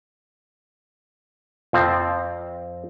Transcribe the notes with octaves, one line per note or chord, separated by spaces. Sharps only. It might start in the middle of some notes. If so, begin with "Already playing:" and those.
F2 F3 C4